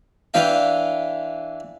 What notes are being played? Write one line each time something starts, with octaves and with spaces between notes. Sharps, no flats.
E3 D4 F5 G5